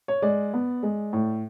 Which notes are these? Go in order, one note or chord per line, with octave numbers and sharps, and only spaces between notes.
C#5
G#3 D5
B3
G#3
A2